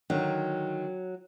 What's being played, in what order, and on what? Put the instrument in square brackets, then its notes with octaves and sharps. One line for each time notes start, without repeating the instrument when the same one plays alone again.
[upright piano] D3 D#3 [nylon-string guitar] F#3